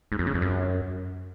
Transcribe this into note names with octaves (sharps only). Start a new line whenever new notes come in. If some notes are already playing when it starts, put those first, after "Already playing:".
G#2
F2
C#3
F2
F#2